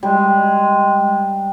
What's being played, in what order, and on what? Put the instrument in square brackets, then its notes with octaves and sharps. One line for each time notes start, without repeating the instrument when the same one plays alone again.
[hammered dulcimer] G3 [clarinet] G#3